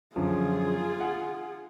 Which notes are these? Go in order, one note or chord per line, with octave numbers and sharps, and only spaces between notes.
F#2 D3 F3 F4 G#4
F#5